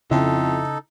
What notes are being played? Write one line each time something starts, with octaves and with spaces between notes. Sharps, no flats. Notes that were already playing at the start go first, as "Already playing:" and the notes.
F2 C#3 D#4 E4 A4